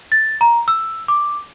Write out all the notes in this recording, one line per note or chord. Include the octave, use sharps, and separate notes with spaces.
A6
A#5
E6
D6